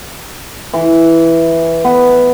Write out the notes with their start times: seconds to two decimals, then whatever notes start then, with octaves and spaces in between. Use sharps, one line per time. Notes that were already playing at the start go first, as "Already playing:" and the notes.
0.74 E3
1.84 B3